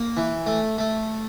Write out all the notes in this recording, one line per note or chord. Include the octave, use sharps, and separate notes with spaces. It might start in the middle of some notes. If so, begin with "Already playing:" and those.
Already playing: A#3
E3
A3
A3